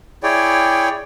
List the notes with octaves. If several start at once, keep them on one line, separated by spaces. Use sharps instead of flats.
E4 G#4 C#5 D5 G5